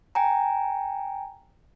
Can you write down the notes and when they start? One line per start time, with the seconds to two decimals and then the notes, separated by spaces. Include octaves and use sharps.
0.15 G5 G#5 A#5